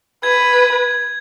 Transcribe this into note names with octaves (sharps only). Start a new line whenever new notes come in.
B4 G#6